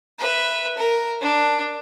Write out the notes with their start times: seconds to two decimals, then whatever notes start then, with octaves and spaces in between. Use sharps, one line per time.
0.19 B4 E5
0.77 A#4
1.21 D4